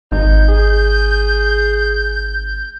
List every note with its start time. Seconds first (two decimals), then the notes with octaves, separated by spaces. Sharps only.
0.12 G#1 D#4 G6
0.48 G#4